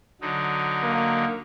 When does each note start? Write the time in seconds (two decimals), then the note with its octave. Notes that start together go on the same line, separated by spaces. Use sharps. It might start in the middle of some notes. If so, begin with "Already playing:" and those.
0.21 D3 F#3 D#4
0.83 A#3